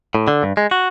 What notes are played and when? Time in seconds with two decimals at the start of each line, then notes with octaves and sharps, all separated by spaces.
0.15 A2
0.28 D3
0.43 G2
0.57 G#3
0.71 F#4